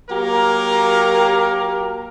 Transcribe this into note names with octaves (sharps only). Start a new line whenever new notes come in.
F#3 A#3 G4 A#4